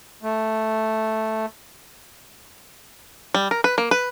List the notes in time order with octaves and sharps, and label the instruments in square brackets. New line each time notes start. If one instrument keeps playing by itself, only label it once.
[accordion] A3
[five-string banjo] G3
A#4
B4
A#3
B4